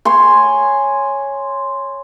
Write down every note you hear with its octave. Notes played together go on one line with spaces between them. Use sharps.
C#5 G#5 C6